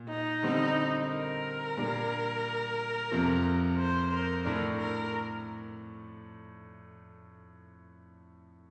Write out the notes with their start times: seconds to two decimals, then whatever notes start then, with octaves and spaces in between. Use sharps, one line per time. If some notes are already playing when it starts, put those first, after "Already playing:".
Already playing: A#2
0.09 D#4
0.43 D3 G3 C4
1.09 A#4
1.77 A#2 G3 D4
3.11 F2 C3 F3
3.78 C5
4.12 A#4
4.45 A2 A3 D4 A#4
4.79 A#4